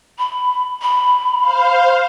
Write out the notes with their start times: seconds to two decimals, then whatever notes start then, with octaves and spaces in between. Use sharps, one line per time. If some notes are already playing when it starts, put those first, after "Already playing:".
0.18 B5
0.82 B5
1.40 C5 F5